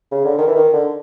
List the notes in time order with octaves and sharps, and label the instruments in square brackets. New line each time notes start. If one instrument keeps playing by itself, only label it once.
[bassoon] C#3
D3
D#3
E3
D#3
D3